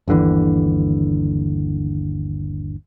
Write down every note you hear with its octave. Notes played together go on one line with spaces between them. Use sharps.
G1 D#2 D3 E3